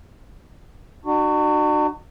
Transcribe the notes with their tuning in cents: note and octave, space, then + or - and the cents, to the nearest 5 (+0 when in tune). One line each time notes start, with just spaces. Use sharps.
D4 +45 F#4 +10